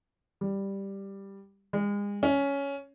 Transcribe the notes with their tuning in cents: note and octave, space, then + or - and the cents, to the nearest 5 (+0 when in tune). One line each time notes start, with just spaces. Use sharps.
G3 +5
G#3 -35
C#4 +10